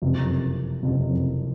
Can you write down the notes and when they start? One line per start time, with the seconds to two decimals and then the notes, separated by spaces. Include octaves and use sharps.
0.02 F#1 F2 C3
0.83 F#1 F2 C3